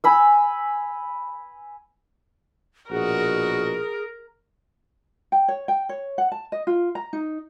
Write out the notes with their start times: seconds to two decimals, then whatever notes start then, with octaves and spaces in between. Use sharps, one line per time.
0.04 G#5 B5 E6
2.91 A#1 B2 F#4 G#4 A#4
5.32 G5
5.48 C#5
5.68 G5
5.89 C#5
6.18 F#5
6.32 A5
6.52 D#5
6.67 F4
6.95 A#5
7.13 D#4